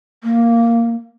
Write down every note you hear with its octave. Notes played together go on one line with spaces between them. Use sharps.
A#3